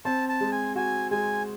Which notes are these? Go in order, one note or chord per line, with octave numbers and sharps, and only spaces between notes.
C4 A5
A5
G#3
G#5
F#4 G#5
G#3 G#5